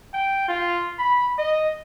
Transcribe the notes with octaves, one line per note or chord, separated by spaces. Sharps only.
G5
F4
B5
D#5